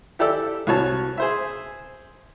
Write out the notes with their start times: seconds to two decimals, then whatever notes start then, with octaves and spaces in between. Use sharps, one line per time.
0.19 E4 G4 A4 D5 E6
0.67 C2 F#4 C#5 A5
1.18 G#4 C5 E5